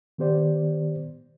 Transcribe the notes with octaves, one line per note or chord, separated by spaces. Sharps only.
D#3 B3 G4 C5 D5